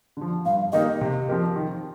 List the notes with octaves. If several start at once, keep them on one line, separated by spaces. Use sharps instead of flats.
D3 F3
G2 F5
D#3 A#3 D#4 G4 D#5
C3
F3 C4 G4 A#4
D#3